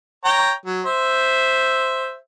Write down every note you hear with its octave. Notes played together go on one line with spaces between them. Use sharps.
C#5 G5 A#5
F#3
C5 E5